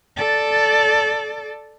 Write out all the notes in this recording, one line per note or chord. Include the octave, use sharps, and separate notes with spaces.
A4 D5